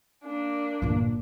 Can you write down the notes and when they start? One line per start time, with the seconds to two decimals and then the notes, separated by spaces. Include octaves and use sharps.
0.25 A#3 D4
0.82 G1 A#2